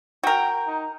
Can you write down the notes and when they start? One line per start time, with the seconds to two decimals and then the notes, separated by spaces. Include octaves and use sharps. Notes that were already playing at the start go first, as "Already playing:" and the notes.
0.23 F#4 A#4 G5
0.67 D#4